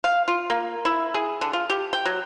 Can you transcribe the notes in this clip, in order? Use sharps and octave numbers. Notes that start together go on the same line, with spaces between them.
F5
F4
A#3
E4
G#4
D3
F4
G4
G5
F#3